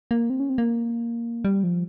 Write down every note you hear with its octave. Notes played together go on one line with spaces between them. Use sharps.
A#3
C4
C#4
C4
A#3
G3
F3